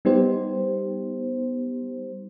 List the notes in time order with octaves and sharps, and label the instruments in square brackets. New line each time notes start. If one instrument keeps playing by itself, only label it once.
[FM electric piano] G3 B3 D#4 G4 C5